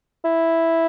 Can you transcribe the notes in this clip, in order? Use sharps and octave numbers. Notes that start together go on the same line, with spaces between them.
E4